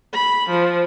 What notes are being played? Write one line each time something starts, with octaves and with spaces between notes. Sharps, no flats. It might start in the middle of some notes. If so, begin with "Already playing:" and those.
B5
F3